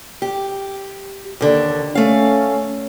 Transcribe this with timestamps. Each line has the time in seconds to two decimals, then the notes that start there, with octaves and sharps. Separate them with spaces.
0.22 G4
1.41 D#2 D3
1.95 A3 C#4 F5